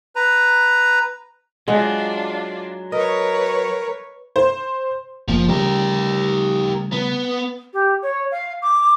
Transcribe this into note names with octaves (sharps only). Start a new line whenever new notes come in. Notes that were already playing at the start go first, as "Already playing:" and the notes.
B4 A#5
F#3 G#3 D4 F4 F#5
A#4 B4 C#5 D#5
C5
F#1 F3 A#3
C#3 G3 A3 G4 A#4
B3
G4
C#5
F5
D6